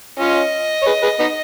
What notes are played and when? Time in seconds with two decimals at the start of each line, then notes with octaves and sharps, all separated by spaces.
0.20 C#4 F4 D#5
0.82 C#5
0.86 G#4 B4
1.03 G#4 B4
1.19 B3 D#4